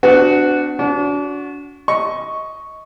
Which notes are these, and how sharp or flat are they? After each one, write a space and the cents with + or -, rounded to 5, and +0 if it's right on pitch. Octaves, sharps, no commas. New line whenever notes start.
B3 +45 D4 +0 F#4 -5
D4 -35 F#4 -10
D#5 +20 C#6 +0